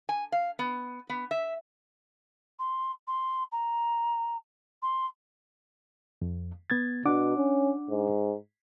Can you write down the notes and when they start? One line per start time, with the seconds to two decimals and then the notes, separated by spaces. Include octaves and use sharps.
0.09 G#5
0.32 F5
0.59 B3
1.09 B3
1.31 E5
2.59 C6
3.07 C6
3.52 A#5
4.82 C6
6.22 F2
6.70 B3 G#6 A6
7.05 B2 D4 F#5 D6
7.37 C#4
7.90 G#2